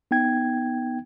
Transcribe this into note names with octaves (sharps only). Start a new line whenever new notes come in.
B3 D#4 G5 G#6